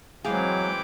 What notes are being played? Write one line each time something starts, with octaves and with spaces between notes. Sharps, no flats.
E3 F#3 G#3 C4 G#4 F5 G5 D6